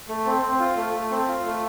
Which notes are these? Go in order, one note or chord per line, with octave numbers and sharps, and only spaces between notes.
A3
C4
C4
F4
A3
A3
C4
F4
A3